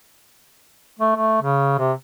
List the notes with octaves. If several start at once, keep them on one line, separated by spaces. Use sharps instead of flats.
A3
A3
C#3
C3